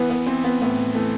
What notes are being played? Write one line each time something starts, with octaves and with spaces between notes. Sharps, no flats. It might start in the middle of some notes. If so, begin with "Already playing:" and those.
Already playing: E3 B3
B3
E3 C4
B3
A2 B3
E3 A3